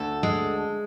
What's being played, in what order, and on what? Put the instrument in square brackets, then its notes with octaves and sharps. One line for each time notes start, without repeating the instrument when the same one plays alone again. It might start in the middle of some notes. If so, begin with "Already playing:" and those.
Already playing: [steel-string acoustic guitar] D2 A4
G#3